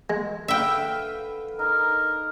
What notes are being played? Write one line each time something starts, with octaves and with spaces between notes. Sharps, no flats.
G#3
D3 B4 E5 F5 G5
D#4 A#4